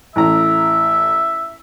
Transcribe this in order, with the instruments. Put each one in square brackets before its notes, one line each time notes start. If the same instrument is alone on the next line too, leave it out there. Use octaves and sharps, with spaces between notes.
[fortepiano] A1 A#5 [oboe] E5